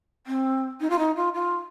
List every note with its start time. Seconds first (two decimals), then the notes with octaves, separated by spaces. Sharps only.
0.27 C4
0.81 D#4
0.90 F4
0.99 D#4
1.16 F4
1.34 F4